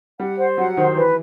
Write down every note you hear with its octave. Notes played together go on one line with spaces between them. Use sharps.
G3 F#5
C5
F#3 F#5
D#3 C5
E3 B4